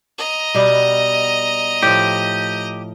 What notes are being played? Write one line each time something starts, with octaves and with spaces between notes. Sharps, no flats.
D#5 A#5
B2 G3 B3
A2 F3 G4